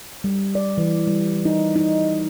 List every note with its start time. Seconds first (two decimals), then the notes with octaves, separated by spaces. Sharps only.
0.24 G3
0.55 D5
0.78 E3
1.07 G3
1.45 D#4
1.76 D#4